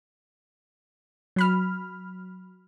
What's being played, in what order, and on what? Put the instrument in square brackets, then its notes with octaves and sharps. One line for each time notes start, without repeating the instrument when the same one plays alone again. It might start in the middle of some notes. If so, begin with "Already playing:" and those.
[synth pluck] F#3 B5 F6